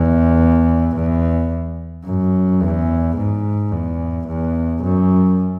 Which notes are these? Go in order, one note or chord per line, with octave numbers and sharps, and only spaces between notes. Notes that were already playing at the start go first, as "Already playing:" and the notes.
Already playing: E2
E2
F#2
E2
G#2
E2
E2
F#2